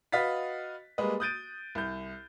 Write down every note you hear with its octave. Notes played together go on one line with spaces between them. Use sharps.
F#4 B4 D#5 F5 A6 B6
G3 G#3 A#3 B4 D#5
D#6 F#6 G6 A6 D7 D#7
C2 G6